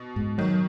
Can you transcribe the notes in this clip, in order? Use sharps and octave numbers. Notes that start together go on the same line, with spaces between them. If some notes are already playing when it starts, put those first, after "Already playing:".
Already playing: B2
G#2
D#3 F#3